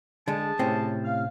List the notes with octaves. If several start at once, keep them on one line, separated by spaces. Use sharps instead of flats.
D3 G#3 G#4 A5
A2 C3 C4 C#4
F5